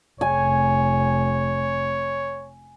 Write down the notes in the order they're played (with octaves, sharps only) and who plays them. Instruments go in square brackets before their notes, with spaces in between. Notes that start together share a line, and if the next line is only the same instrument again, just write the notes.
[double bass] F1 [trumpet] C#5 [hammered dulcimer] G#5